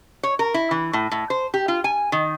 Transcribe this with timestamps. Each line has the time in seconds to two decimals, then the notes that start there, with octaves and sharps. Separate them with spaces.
0.23 C#5
0.39 A#4
0.54 E4
0.71 E3
0.93 A2
1.12 A2
1.30 C5
1.54 G4
1.68 F4
1.84 G#5
2.12 D#3